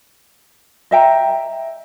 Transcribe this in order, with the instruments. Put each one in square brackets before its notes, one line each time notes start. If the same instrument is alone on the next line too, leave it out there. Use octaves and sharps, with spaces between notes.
[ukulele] D#5 E5 G5 A#5